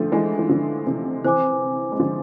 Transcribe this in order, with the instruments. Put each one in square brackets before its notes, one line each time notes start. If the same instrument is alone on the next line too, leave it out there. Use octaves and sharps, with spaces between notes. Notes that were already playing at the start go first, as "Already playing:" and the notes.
Already playing: [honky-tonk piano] D3 F3 A3 [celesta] D4 A4 E5
[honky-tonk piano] E3 G#3
E3
D3 F3
C3 E3
[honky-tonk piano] C3 E3 [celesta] C5 G#5 D6
[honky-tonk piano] G#3
D3 F3